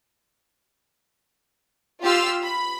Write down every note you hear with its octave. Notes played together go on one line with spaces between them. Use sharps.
F4 G4 C6 E6 F6
B5